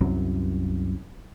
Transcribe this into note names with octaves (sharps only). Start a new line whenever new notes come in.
C2 F#2